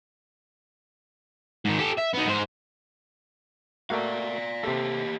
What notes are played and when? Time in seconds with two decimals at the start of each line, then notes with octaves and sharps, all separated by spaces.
1.65 G#2 D#3
1.79 G4 A4
1.98 E5
2.14 B3 D#4
2.28 G#2 C5
3.90 A3 A#3 F#4 D5 F5
4.63 C3 A#3 G4 A4